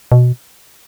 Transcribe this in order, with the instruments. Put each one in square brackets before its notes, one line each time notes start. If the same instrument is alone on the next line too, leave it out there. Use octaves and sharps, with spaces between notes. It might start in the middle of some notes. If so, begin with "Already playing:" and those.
[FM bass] B2